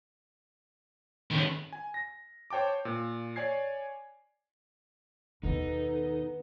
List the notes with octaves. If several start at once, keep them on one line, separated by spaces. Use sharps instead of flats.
G2 D#3 B3 C#4
G#5
A#6
C5 C#5 G5 A5 D6
A#2
C#5 D5 G#5 G#6 C7
D#2 B2 B3 D#4 A4